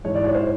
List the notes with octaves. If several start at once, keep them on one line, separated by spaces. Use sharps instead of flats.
G#2 E3 C#5
D5
C#5
C5